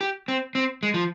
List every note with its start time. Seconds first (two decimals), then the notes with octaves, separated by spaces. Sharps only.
0.01 G4
0.28 C4
0.55 C4
0.83 G#3
0.94 F3